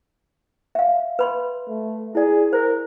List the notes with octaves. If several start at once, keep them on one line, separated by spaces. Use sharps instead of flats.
E5 F5
B4 B5 C6
A3
E4 G#4 D5
A#4 C5